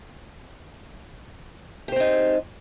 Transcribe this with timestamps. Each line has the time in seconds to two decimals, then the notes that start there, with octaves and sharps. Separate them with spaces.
1.88 G4
1.92 C5
1.96 C4
2.00 D#4